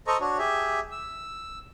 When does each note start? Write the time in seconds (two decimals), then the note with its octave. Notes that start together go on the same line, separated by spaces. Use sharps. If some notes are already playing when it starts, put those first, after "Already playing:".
0.07 A4 C5 D#5 A#5 C#6
0.20 D4 F#4 C#5
0.38 G4 G#4 E5
0.91 E6